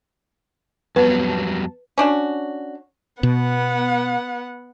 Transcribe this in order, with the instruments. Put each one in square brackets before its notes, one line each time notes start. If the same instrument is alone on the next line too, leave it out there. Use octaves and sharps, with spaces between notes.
[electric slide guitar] F2 F#3 G3 [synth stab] B3 A5 [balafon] B4
[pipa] C#4 D4 F#4
[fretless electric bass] B2 [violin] B3 F#5